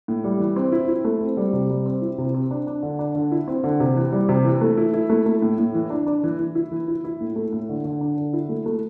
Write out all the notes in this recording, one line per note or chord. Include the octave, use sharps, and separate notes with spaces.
A2
G3
E3
C4
E4
E4
A3
C4
G3
C3
G3
C4
E4
C3
C4
D4
D4
D3
D4
D3
E4
C4
D3
C3
E3
G3
C3
E3
A3
E4
E4
A3
A3
A2
A2
E3
D4
D4
E3
E3
E4
E3
E4
E4
A2
A3
A2
D3
D3
D4
D3
E4
A3
A3